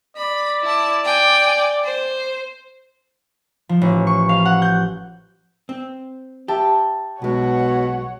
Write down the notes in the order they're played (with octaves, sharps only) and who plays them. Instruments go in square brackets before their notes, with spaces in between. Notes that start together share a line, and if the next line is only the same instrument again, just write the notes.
[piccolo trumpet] D5 [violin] B5
[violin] E4 A5
G5 G#5
C5
[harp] F3
A1
C#6
F5
F#5
G6
[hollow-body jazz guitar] C4
[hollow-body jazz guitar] G4 [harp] E5 A5
[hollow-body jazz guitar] B1 G#3 [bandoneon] B2 [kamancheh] C#5 F#5